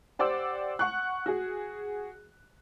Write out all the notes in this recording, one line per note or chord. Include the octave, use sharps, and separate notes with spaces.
G4 C5 D5 F#5 D6 E6
F#5 C#6 F#6
F#4 G#4